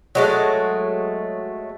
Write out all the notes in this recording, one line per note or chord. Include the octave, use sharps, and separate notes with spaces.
F#3 G#3 A3